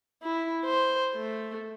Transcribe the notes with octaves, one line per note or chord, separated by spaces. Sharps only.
E4
C5
A3